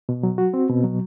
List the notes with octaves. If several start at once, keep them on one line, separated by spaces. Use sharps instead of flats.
B2
F#3
F#4
C4
B2
F#3